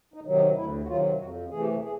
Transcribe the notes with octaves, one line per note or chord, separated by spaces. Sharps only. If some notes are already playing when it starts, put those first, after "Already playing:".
D#4
C3 D#3 F#3
D#4
D2 E4
F#4
C3 D#3 F#3 F4
F2 F#4
C3 E3 A3 G#4
G4
G#4